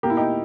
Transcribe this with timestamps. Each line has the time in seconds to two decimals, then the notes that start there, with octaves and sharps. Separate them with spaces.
0.03 B2 A#3 G4
0.10 E4
0.17 D#4 G4